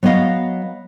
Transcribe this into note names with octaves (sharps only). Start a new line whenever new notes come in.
F#3 B3 C#5 D#5 F5